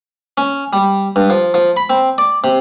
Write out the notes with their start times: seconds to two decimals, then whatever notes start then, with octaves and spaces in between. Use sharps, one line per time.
0.38 C#4
0.73 G3
1.16 G2
1.30 F3
1.54 F3
1.77 B5
1.90 C4
2.18 D5
2.44 C3